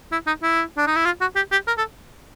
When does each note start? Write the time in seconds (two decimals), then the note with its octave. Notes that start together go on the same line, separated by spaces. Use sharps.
0.12 E4
0.27 D#4
0.43 E4
0.77 D4
0.87 D#4
0.96 E4
1.05 F4
1.21 F#4
1.36 G4
1.52 G4
1.67 A#4
1.78 A4